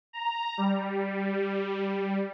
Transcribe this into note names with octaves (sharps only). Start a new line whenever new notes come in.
A#5
G3